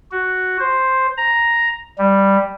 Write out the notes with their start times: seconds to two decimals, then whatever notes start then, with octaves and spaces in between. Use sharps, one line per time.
0.12 F#4
0.60 C5
1.17 A#5
1.98 G3